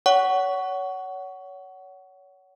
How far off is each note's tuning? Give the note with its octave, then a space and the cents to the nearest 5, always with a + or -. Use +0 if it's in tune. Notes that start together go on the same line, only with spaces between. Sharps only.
C#5 +25 F#5 +20 C#6 +15